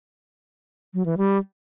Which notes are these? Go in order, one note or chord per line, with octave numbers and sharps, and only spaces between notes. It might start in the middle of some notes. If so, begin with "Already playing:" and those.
F#3
E3
G3